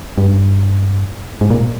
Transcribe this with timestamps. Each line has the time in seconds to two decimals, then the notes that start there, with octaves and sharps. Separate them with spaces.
0.18 G2
1.41 G#2
1.50 A#2